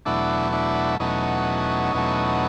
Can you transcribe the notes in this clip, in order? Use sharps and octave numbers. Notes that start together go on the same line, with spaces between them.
E2 B2 F#3 A3 D4 E4
D4 E4
E2 B2 F#3 A3 C#4 D#4
E2 B2 F#3 A3